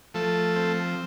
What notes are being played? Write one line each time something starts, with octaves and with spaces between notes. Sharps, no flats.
F3 A3 A4
C4